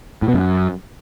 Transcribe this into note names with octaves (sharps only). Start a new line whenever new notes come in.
A2
B2
F#2